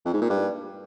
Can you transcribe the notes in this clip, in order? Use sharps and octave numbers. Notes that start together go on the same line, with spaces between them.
F2
G#2
A#2
G2